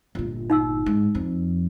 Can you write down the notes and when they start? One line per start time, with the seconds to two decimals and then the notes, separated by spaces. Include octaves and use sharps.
0.15 G1 A#2
0.50 D#4 F#5 E6
0.86 G#2
1.15 F2